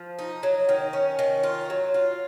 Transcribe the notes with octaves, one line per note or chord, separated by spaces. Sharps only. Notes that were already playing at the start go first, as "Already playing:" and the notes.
Already playing: F3
D#4
F#3
D#3
C#4
D#3
F4
F#3
F4